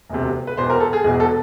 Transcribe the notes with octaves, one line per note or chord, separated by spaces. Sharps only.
E1 D2 C3
B4
E1 E2 B2 C5
A#4
A4
G#4
E1 E2 B2 G#4
A4